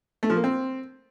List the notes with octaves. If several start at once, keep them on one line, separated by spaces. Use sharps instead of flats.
A3
F3
A#3
C4